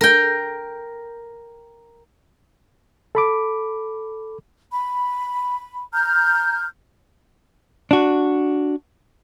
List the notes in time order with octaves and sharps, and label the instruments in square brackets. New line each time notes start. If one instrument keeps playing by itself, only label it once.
[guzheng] A#4 G5
[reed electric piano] A4 B5 D6
[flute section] B5
A#5 F6 G6
[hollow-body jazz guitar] D4 F#4